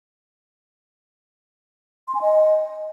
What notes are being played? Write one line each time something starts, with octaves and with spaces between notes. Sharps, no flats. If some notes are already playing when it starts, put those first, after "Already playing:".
C6
G#5
D#5